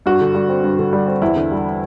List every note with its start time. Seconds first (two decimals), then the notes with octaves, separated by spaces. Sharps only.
0.06 G2 F#4
0.21 D3
0.35 G3
0.49 C4
0.64 G2
0.79 D3
0.93 G3
1.08 C4
1.22 E2 E4
1.36 D3
1.51 G3